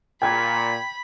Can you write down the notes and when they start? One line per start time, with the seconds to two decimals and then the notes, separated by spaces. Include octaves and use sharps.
0.22 A#2 G5 B5 G#6